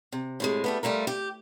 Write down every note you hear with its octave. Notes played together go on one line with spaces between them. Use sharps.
C3
A2 C3 G#3
G3 A3 B3
G3 A3 F4 A#4
G4